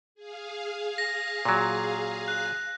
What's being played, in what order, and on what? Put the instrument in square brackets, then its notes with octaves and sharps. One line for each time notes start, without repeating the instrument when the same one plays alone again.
[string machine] G#4 F5
[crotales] A#6
[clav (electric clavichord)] A#2 F#3
[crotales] F#6